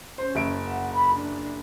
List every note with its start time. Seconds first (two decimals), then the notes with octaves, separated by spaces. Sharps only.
0.18 C#4 C5
0.35 F#1 E5 D7
0.67 F#5
0.94 B5
1.14 D4